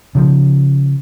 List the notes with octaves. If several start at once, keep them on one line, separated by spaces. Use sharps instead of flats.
C#3 F3